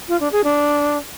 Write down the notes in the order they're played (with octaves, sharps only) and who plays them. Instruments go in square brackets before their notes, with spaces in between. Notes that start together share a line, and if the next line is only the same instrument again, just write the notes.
[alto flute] F4
D4
G#4
D4